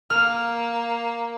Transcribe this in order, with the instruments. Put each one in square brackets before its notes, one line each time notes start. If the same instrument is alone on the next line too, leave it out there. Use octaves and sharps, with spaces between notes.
[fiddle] A#3 [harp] F6